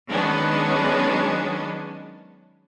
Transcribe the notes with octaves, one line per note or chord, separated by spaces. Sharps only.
D#3 F#3 G#3 B3 C#4 D4